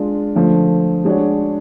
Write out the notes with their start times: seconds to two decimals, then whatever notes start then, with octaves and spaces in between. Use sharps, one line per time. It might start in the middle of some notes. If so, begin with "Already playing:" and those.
Already playing: G#3 D4 F4
0.35 D3 F3 A3
1.05 G#3 D4 F#4 C#5